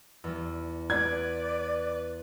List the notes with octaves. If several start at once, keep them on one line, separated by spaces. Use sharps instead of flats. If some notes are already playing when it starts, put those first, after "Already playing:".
E2 G3
B4 D5 F#5 G#6